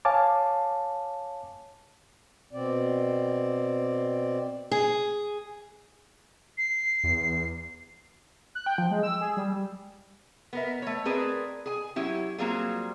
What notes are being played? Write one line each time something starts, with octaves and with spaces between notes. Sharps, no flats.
C#5 F5 G#5 A5 D6
B2 C4 D5
G#4
C7
E2
F#6
G5
F3
G#3
E6
G#4
G3
B3 A#4 E5
A3 C#5
C4 G#4 A#4 B4 D5
G#4 G#5
F#3 C#4 E4 G4
F#3 G3 A#3 C4 F4 G#4